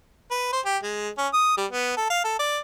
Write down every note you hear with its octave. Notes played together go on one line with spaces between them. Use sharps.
B4
C5
G4
G#3
C#4
D#6
G3
B3
A4
F5
A4
D5